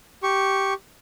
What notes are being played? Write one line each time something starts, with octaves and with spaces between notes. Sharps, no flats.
G4 C#6